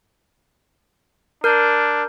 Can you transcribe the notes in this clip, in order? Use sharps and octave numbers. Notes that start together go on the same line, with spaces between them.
D4 A#4 G6